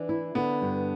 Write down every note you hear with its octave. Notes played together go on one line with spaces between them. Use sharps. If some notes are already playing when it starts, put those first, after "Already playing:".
Already playing: E3 D4
E4
D3 B3
G2